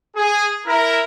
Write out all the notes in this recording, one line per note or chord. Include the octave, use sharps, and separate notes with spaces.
G#4
E4 A#4